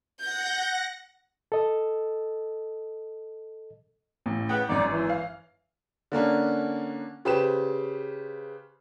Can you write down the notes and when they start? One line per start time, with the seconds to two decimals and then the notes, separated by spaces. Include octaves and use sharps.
0.20 F#5 G6 A#6
1.52 A4 D#5
4.26 A1
4.49 C#3 B3 G5
4.69 G#1 F#2 D#4 D5
4.91 E3
5.10 F5
6.12 D3 A#3 C#4 D4
7.25 C#3 G4 B4 C5 E7